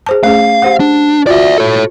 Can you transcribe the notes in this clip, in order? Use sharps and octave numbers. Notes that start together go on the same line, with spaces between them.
G#4 C5 A5
A3 C#4 G#4 F5
G4 C5 F#5
D4
F4 F#4 D5 E5
A4 C#5